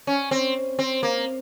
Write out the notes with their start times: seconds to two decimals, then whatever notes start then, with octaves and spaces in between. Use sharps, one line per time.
0.07 C#4
0.31 C4
0.79 C4
1.03 A#3